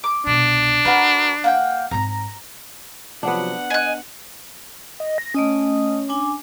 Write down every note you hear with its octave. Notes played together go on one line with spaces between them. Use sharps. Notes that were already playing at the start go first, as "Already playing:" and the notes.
D6
C2 B2 D4
D3 F#4 A#4 B4
A#3 F#5 G5
G#2 C4 A#5
C3 F3 F#3 B3 D4 F#5
D#5 G#5 F#6
D#5
A#6
A3 C#4 D#5 D#6
D4 G#5 D6